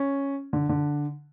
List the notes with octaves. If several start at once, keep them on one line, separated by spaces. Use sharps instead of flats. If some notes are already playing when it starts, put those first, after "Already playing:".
Already playing: C#4
D3
D3